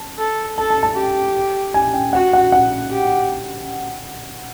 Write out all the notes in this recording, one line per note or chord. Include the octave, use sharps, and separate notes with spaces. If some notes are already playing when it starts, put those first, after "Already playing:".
Already playing: A5
A4
A4 A5
A5
A5
G4
G#5
G5
F#4 F#5
F#5
F#5
G4